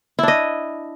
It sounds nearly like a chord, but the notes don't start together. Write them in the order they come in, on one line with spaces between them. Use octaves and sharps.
E4 D4 D#5